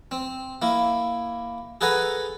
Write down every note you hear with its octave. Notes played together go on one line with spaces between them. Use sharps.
C4
A#3 E4
G#4 A4 B4 F#5 G#5 A#5